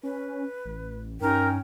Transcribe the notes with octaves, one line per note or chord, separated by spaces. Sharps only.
C#4 B4
A1
G2 C#4 D#4 A#4 G5